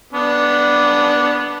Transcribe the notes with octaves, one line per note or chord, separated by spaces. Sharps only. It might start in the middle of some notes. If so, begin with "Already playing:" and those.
B3 D4